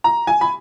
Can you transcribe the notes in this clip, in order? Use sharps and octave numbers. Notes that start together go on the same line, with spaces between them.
A#5
G#5
B5